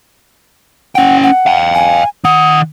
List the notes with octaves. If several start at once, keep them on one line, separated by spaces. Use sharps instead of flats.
C#4 F#5 G5
F#5
F5 G5
G#5
D#3 F#5 D#6